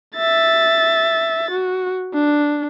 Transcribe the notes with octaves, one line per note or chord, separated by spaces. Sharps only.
E5 A6
F#4
D4